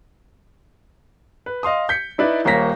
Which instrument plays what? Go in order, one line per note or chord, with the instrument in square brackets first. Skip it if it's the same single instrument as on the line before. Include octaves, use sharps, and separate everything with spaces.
[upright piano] B4
D#5 F5 C6 D#6
G6 B6 C#7
D#4 E4 B4 D5 E5
D#1 A#3 A#4 C#5 A#6 B6